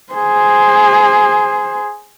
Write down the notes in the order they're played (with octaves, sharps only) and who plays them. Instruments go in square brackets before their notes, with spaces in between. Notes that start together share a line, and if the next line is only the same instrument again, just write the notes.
[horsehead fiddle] G#4 C5